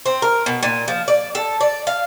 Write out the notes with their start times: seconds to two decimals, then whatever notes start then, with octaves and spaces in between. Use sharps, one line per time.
0.06 C4
0.22 A#4
0.46 B2
0.63 A#2
0.88 F3
1.08 D5
1.35 A4
1.61 D5
1.87 F5